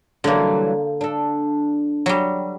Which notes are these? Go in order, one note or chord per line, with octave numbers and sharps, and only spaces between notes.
D3 E3 F#3 G3 A#3
D4 A4
F#3 G3